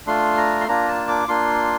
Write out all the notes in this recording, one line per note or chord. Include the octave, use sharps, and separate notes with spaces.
A3 D4 F4 C6
A#5
C6
A#3 D4 F4 A#5
A5
D6
A#3 D4 F4 C6